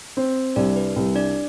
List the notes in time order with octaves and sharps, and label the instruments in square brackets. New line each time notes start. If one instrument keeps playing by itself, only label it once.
[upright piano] C4
[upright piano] C2 [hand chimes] D4 D5
[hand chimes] B4
[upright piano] C2
[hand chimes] D4 D5